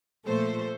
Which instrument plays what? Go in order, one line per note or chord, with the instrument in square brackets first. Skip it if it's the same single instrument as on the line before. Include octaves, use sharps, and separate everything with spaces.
[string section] A#2 F3 A3 A4 C5